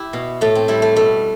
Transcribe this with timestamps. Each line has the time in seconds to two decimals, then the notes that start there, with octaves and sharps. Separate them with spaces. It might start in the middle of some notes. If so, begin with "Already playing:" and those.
Already playing: E4 G4
0.13 B2
0.41 A2 A3
0.55 C4
0.68 G3 E4
0.82 A3
0.96 B2 A3